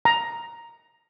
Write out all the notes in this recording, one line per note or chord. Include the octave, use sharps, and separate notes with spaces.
A#5